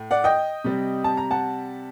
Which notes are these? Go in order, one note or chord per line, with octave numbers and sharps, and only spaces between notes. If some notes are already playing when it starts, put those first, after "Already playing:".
Already playing: A2
D5 F#5
D#5 G5
C3 G3
A5
A#5
F#5 A5